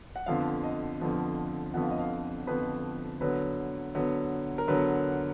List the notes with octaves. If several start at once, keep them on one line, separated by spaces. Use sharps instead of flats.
F#5
F2 D3 F3 B3 F5
D#5
F2 D3 F3 B3
F2 D3 F3 B3 F#5
F5
D#5
F5
F2 D3 F3 B3 B4
D3 F#3 B3 B4
D3 F#3 B3
A#4
D3 F#3 B3 B4